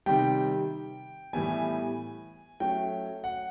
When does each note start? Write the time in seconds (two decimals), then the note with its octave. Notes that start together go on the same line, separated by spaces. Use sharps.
0.06 C3 D#3 G3 G5
1.33 A2 E3 G3 B3 G#5
2.60 F#3 A3 C#4 G5
3.24 F#5